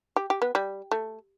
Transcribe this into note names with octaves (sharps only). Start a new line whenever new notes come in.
G4
G4
B3
G3
A3